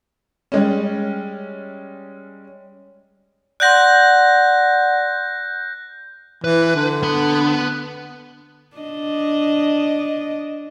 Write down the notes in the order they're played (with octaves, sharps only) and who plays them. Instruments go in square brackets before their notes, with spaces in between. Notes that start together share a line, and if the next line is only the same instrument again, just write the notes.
[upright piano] G3 G#3 C#4
[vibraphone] D5 F#5 C6 [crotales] F#6 G6 A#6
[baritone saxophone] E3 [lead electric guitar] B4
[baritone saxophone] D3
[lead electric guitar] B3 B5
[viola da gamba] D4 D#5